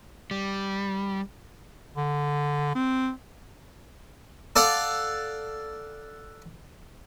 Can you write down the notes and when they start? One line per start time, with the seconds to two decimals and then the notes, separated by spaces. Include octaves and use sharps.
0.31 G3
1.96 D3
2.75 C4
4.56 A4 D5 F5 F#5